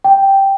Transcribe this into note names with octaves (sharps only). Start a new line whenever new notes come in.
G5